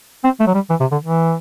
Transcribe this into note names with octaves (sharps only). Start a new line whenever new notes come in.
C4
A3
F#3
G3
E3
C3
D3
E3